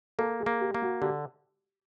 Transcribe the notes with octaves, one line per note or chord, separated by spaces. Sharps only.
A#3 A4
G#4
A#3
G4
A#3
F#4
D3 G4